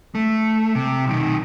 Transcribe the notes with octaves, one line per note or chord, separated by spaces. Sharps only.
A3
C3
B1 D#3